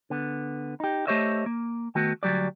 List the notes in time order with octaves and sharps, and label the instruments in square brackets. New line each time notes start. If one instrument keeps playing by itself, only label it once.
[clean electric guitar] D3 B3
D#4 G4
A3 G4 C5 C#5 D#5 E5
A#3
D#3 A3 B3 F#4
D2 B2 F#3 G3 D5